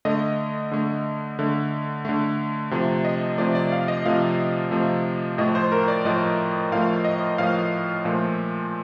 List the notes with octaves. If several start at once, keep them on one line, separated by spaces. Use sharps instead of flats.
D3 A3 D#5
D3 A3
D3 A3
D3 A3
C3 F3 A3
D#5
C3 F3 A3 D5
D5
F5
D#5
C3 F3 A3 F5
C3 F3 A3
A2 F3 A3 D#5
C5
A#4
D5
A2 F3 A3 D#5
A2 F3 A3 F5
D#5
A2 F3 A3 F5
A#2 F3 A3